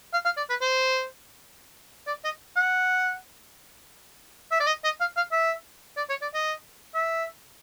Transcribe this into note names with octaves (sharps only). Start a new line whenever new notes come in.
F5
F5
D5
B4
C5
D5
D#5
F#5
E5
D5
D#5
D#5
F5
F5
E5
D5
C#5
D5
D#5
E5